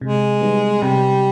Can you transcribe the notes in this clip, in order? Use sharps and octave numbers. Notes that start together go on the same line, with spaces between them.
C3 G#3
D#3 G3 B3
C3 G3